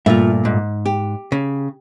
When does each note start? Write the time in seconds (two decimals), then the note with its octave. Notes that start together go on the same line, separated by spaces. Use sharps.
0.06 G2 A#2 A3 F4 E5
0.45 G#2
0.86 G4
1.32 C#3